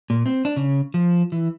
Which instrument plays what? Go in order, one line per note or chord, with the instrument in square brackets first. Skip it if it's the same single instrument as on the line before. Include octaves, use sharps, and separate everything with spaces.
[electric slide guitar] A#2
C4
D4
C#3
F3
E3